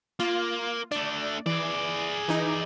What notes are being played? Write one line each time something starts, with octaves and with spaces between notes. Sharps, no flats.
A#3 F4
A3 D4 D5
E3 G#4 D5
E3 D#4